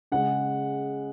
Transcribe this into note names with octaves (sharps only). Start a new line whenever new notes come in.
C#3 G#3 F#5